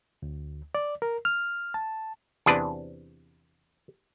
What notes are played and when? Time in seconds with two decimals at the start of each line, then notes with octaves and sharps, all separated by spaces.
0.22 D2
0.75 D5
1.02 A#4
1.25 F6
1.74 A5
2.46 E2 C3 D4 B4